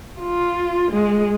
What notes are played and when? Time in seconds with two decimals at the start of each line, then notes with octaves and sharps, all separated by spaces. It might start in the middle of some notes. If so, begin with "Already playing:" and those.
0.20 F4
0.91 G#3